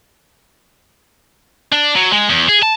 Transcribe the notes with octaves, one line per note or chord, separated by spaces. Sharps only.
D4
F#3
G#3
E2
G#4
A5